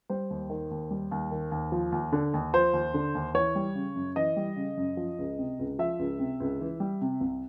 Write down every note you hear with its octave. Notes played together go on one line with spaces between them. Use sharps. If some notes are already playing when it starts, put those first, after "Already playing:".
G3 C5
D#2
D#3
D#2
G3
D#2
D#3
D#2
F3
D#2
D3
D#2
F3 C5
D#2
D3
D#2
E3 C#5
G3
C#3
F#2
E3 D#5
G3
C#3
F#2
F3
C#2
C3
C#2
F3 E5
C#2
C3
C#2
E3
G3
C3
C2